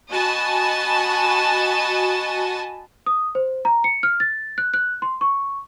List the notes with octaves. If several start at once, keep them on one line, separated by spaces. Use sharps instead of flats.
F#4 D#5 G#5 A5 B5
D#6
C5
A#5
C#7
F6
A6
F#6
F#6
C6
C#6